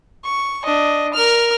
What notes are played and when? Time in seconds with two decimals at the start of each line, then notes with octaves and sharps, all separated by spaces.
0.25 C#6
0.65 D4 D#5
1.14 A#4 F6